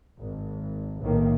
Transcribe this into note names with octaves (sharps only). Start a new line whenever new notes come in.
G#1
B1 A2 D#3 A#3